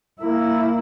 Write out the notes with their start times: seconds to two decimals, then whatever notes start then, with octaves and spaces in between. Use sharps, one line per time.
0.22 A#3 E4